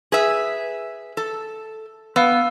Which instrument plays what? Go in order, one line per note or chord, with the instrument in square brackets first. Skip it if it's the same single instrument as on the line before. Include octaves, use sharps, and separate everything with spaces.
[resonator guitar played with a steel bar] G#4 B4 E5
A4
[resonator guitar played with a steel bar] B3 [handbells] F5 E6